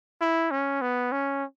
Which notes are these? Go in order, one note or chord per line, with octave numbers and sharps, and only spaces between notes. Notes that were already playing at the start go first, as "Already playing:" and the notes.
E4
C#4
B3
C#4